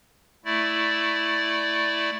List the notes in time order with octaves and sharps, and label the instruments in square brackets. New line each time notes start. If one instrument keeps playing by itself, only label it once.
[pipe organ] A3 E4 D5